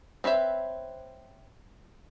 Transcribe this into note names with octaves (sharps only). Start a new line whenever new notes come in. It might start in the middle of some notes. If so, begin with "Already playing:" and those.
C4 B4 C#5 E5